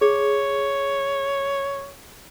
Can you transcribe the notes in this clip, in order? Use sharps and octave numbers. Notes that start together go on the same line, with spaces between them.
G#4 C#5